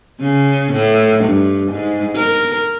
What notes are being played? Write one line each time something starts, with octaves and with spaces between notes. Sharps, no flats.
C#3
A2
G2
G#2
A#4